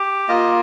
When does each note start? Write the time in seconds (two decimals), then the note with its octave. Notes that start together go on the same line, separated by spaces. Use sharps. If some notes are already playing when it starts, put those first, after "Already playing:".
Already playing: G4
0.28 A#3 F4 D#5